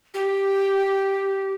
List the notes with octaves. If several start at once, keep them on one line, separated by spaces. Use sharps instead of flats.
G4